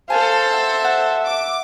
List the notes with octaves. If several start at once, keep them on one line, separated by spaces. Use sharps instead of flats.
A4 C5 F5 G#5 A5 F#6
E5 F#5
F#5
D6